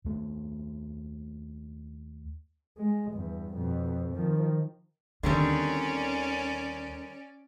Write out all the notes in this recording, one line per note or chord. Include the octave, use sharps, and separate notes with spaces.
D#2 A3 B3
G#3
E2 G2
F2 B2
D#3 F3
D#2 D3 D#3 G3 C4 C#4 D5